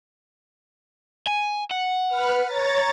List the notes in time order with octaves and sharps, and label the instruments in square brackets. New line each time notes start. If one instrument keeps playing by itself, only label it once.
[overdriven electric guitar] G#5
F#5
[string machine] B4 F6
C#5 A#5 A6